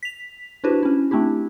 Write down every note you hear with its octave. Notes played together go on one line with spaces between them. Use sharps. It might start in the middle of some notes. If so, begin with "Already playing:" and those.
B6 F7
D4 E4 F#4 G4 B4 C5
C#4 E4
A3 C4 D4 E4 G4